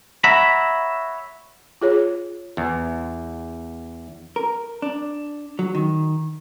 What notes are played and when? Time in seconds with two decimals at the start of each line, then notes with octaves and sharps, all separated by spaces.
0.24 C#5 E5 F#5 A#5 B5
1.81 F4 G#4 C#5
2.57 E2
4.36 A#4
4.82 D4
5.59 F#3
5.75 D#3